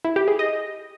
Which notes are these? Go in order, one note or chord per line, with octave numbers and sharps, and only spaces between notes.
E4
G4
G#4
D#5